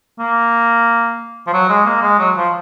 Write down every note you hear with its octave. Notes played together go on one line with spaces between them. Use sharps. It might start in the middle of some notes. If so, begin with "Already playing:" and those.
A#3
F3
F#3
G#3
A#3
G#3
F#3
F3